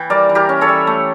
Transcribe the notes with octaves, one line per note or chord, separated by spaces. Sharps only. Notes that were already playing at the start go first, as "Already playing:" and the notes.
Already playing: E3 G5
G3 A#4 D5
E3
G4 A#4
C#4
A4 C#5
G3
A3